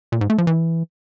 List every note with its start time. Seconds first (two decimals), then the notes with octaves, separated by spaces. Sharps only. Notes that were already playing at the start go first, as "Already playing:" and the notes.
0.12 A#2
0.21 G#2
0.30 A3
0.38 F3
0.47 E3